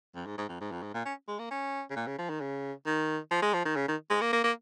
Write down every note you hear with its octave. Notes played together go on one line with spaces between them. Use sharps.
F2
G#2
G#2
F2
G#2
F2
G#2
A#2
C#4
G#3
A#3
C#4
C#3
A#2
C#3
F3
D#3
C#3
D#3
F3
G#3
F3
D#3
C#3
D#3
G#3
A#3
A#3
A#3